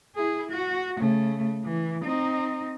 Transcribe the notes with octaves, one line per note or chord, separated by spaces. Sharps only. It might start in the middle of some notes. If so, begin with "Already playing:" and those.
E4 G#4
F#4
C#3 A3
E3
C4 D#4